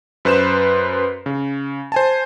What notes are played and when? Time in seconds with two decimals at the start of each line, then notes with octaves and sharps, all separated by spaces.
0.25 F#2 B4 C5 C6 E7
1.26 C#3
1.92 C5 G#5 A5